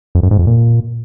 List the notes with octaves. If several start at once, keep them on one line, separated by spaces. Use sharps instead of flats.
F2
F#2
G#2
F2
A#2